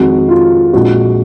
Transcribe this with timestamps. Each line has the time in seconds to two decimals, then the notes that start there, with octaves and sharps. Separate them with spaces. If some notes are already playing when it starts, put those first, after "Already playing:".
Already playing: F2 D#3 G#3 C4 F#4
0.29 F4
0.73 A#1 A#2 G#3 C4 F#4